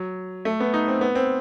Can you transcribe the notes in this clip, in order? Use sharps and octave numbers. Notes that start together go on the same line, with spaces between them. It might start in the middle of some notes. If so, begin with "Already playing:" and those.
Already playing: F#3
A3
B3
D#4
C4
B3
C4